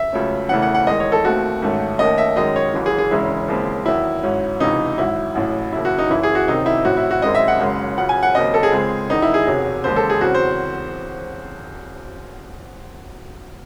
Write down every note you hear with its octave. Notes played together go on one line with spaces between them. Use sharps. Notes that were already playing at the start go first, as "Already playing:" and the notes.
Already playing: E5
C#2 C#3 F#3 A3 C#4
E1 E2 C#3 E3 A3 F#5
F#5
F#5
E2 D#3 G#3 D#5
C#5
A4
D#2 D#3 A3 C4 F#4
A1 G#2 D#3 A3 C#4
D#2 D#3 A3 C#4 D#5
E5
F#2 D#3 G#3 C#4 D#5
C#5
F#1 F#2 E3
G#4
G#4
E1 E2 C#3 G#3 C#4 E4
D#2 C#3 G#3 C4
E2 D#3 F#3 E4
G#2 F#3 C#4
C#2 C3 E3 D#4
G#1 G#2 F#3 E4
A1 A2 F#3
D#2 C#3 F#3 E4
F#4
D#4
F#1 F#2 E3 E4
G#4
F#4
C2 C3 D#3 F#3 C4 D#4
E4
A1 A2 F#3 C4 F#4
E4
F#4
G#1 F#2 D#3 G#3 C4 D#5
E5
F#5
F#1 F#2 C#3 G#3 C#4
C#2 C#3 F#3 F#5
G#5
F#5
D#2 C#3 F#3 C4 D#5
A4
G#4
C#2 C#3 G#3 C4
E1 E2 D#3 D#4
E4
G#4
F#1 E2 C3 F#3 C#4
E1 D#2 C#3 G#3 C5
A4
G#4
E2 C#3 F#3 C4 F#4
C5